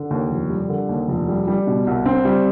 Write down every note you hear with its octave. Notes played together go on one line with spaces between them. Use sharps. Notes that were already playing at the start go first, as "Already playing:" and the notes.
Already playing: D3
D#2
F1
G3
D3
D#2
F1
G3
G3
B2
C2
C4
G3